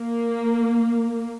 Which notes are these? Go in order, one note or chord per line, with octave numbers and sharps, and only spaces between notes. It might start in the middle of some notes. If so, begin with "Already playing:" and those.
Already playing: A#3